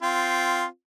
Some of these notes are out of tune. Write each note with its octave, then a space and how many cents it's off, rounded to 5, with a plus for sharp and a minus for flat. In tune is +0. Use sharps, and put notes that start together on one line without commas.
C4 -10 F4 +0